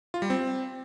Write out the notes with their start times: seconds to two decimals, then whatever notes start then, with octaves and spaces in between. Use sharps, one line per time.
0.14 F4
0.22 G3
0.30 C4